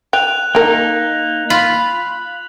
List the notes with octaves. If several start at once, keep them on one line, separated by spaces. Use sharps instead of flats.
G5 F#6 F7
A#3 D#4 A#4 G5
F4 B5